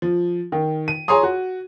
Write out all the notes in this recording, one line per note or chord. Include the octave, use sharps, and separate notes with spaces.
F3
D#3
D#7
G#4 C#5 A#5 C6 D#6
F#4